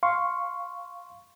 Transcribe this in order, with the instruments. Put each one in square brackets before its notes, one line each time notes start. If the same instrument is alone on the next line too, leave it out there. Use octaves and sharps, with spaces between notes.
[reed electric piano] F5 C6 C#6